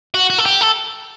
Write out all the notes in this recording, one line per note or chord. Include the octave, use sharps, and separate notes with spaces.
F#4
F#4
A4
G4
A4